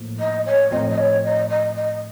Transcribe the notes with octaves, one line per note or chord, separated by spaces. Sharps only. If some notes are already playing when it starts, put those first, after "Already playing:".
Already playing: A2 F3 A#3
D#5
C#5
A2 F3 C4 D#5
D#5
C#5
D#5
D#5
D#5